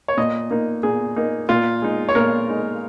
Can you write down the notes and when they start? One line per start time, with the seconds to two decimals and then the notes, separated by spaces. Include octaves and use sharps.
0.08 C#5
0.17 A#2 D#5
0.51 A#3 D#4
0.83 A#2 G#4
1.16 A#3 D#4
1.49 A#2 F4
1.82 G#3 D#4
2.09 C#5
2.15 A#2 A#4
2.48 G#3 D#4